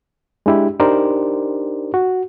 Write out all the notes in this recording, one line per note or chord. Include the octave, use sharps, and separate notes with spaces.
G#3 D4 E4 G4
D4 D#4 G4 A#4 C5 D5
F#4